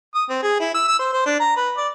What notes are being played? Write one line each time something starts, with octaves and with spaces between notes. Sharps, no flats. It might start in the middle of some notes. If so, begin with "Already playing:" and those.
D#6
C4
G#4
E4
E6
E6
C5
C5
D4
A#5
B4
D5